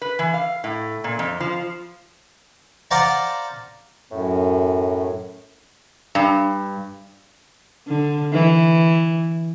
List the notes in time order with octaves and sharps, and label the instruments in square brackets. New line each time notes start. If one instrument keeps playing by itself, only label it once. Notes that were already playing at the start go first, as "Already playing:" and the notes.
[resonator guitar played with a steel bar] B4
E3
F5
A2
A#2
F2
F3
[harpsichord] C5 D5 F5 F#5 A5 A#5
[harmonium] F#2 [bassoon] A2
[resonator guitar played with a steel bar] G2
[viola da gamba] D3
E3